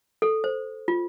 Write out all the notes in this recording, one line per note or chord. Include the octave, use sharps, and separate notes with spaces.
A4
C5
F4